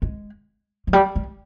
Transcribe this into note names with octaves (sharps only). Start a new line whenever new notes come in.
G#3
F3
G3
G#3